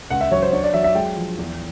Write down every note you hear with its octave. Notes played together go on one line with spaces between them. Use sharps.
C#2 F#5
E5
F#3 C#5
C5
D4 C#5
D5
F#3 E5
E5
G#3 G5
F3
E2